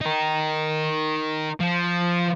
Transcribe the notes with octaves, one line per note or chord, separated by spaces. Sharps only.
D#4 A#4
F3